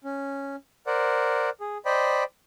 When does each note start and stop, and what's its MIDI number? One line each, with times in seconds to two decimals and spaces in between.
0.04 0.56 61
0.87 1.50 70
0.87 1.50 72
0.87 1.50 74
0.87 1.50 78
1.61 1.78 68
1.85 2.24 72
1.85 2.24 74
1.85 2.24 75
1.85 2.24 79
1.85 2.24 83